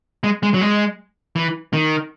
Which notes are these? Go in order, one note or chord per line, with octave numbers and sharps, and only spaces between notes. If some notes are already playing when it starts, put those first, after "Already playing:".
G#3
G#3
F#3
G#3
E3
D#3